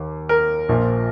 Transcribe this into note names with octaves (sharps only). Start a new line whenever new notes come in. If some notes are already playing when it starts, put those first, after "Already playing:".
Already playing: D#2
A#4
A#1 A#2 F3